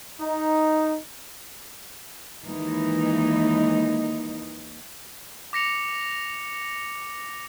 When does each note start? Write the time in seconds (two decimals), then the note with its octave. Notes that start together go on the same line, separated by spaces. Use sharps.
0.21 D#4
2.45 D#2 E3 G#3 D#4
5.53 D6 A#6 C#7 F7